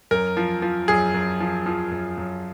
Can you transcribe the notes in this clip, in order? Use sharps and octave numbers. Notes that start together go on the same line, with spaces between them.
F#2 A#4
F3
F3
F#2 G#4
F#2
F3
F3
F#2
F#2